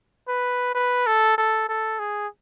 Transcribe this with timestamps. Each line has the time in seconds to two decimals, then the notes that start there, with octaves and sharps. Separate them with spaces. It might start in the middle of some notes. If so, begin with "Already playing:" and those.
0.28 B4
0.75 B4
1.06 A4
1.38 A4
1.69 A4
1.99 G#4